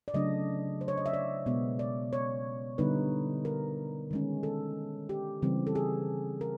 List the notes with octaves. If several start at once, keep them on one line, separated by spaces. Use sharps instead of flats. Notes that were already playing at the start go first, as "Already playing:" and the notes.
D5
C#3 F#3 A3 D4 D#5
C5
C#5
D#5
E5
D5
B2 G#3 B3
D5
C#5
D3 G3 B3 D#4 B4
A#4
D#3 G#3 C#4
A4
G4
C#3 E3 G3 C4
A4
G#4
A#4